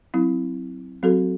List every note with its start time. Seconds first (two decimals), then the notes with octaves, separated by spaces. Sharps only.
0.14 F#3 C4 E4
1.03 F#3 C4 F#4 A4